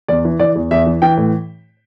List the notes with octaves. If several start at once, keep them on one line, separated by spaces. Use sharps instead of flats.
E2 D5
E3
E3 D5
E2
E2 E5
E3
E3 G5
A2